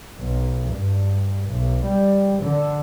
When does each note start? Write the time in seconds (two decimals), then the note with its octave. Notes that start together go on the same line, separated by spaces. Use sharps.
0.18 B1
0.73 G2
1.48 B1
1.85 G3
2.39 D3